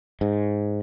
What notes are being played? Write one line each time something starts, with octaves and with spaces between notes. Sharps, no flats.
G#2